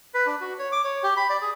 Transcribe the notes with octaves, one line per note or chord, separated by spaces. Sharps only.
B4
D4
F#4
C#5
D6
C#5
G4
B5
D5
G#4